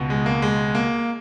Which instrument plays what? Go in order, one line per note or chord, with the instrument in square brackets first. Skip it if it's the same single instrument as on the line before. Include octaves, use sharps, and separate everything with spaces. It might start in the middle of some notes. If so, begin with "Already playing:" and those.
Already playing: [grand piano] C#2 B2
G#3
A#3
G#3
A#3